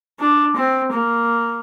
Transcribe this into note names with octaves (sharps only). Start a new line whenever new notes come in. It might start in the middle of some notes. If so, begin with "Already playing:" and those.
D4
C4
A#3